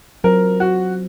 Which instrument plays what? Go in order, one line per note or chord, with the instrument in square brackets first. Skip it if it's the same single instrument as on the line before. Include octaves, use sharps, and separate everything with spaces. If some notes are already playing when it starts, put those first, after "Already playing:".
[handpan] F#3 C4 F4 C5 [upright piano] A#4
[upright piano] F#4